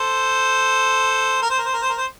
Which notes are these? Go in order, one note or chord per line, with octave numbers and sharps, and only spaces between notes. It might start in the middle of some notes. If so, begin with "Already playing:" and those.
Already playing: A4 C5
A#4
C5
A#4
C5
A#4
C5
A#4
C5